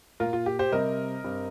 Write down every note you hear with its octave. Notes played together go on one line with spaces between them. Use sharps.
A#2 A#3 F4 A#4
F4
G4
G4 C5
C3 G3 C4 A#4 D#5
G2 G3 C4